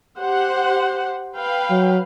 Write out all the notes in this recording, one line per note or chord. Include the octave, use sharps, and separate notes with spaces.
G4 C5 F#5
B4 F5 G5
F#3